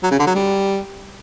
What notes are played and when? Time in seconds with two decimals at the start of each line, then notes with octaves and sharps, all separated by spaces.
0.03 F#3
0.11 C#3
0.19 D3
0.27 F#3
0.35 G3